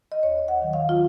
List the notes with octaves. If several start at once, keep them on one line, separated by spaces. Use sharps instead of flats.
D#5
D#2 C#5
F#5
D#3 F#3
F5
F4